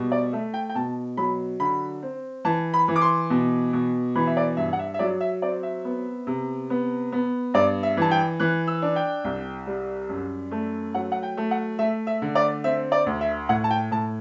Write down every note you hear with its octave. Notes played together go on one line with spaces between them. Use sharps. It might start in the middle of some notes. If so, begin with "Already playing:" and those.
Already playing: B2 G3
D5
A3 E5
G5
G5
B2 A5
F#3 B5
D3 B5
C4
E3 A5
B5
E3
D6
C6
B2
B2
E3 B5
E5
D5
G2 E5
F#5
E5
E5
F#3 D5
E5
C4 D5
E5
B3
C3
B3
B3
G2 D5
E5
E3 A5
G5
E3 F#6
E6
D4
G5
C2
G3
F#2
A3
F#3 F#5
F#5
G5
A3
F#5
A3 E5
E5
D3
D5
C4 E5
D5
D2
E5
A2 F#5
A5
G5
A2 A5